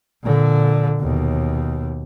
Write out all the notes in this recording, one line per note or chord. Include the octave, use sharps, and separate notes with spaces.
A#2 D3
D#2 B2